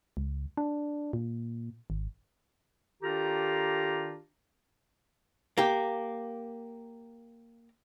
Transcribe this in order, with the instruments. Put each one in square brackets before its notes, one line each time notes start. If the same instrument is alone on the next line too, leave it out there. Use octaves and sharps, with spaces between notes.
[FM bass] C#2
D4
A#2
G#1
[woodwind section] D#3 D4 F4 G4 A4 A#5
[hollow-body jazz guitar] A#3 G4